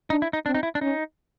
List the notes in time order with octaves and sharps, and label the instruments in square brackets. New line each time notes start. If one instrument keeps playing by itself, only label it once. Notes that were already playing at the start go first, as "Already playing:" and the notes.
[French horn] D4 [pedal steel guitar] D#4
[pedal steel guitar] E4
D#4
[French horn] C4 [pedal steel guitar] D4
[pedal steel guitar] D#4
E4
D4
[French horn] C#4 [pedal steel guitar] D#4